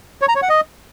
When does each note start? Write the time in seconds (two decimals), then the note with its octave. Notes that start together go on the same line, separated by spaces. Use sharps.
0.22 C#5
0.28 A#5
0.35 C#5
0.42 F#5
0.49 D#5